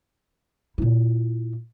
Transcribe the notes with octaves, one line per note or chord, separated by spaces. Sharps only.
A#2 E4